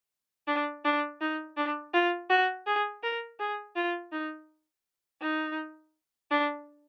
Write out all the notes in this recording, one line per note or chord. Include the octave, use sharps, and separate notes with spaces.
D4
D4
D#4
D4
F4
F#4
G#4
A#4
G#4
F4
D#4
D#4
D4